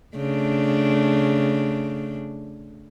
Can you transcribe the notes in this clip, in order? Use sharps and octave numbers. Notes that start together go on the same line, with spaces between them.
C#3 A3 D4